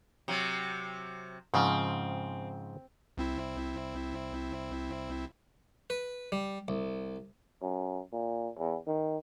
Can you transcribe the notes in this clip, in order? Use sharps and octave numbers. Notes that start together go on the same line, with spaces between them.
C3 F#3
G#2 C#3 F3 C4
C2 C4 E4
B4
G3
C2
F#2
A#2
E2
D#3